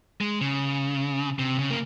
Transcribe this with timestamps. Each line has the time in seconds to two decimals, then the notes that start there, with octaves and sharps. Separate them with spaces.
0.21 G#3
0.41 C#3
1.39 C3
1.59 C#3
1.70 A#3